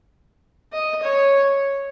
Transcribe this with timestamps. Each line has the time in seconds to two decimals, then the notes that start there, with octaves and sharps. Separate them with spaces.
0.72 D#5
1.03 C#5